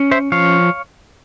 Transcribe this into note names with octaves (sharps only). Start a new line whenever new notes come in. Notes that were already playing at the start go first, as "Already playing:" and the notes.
Already playing: C#4
C5 E5
F3 C#5 F5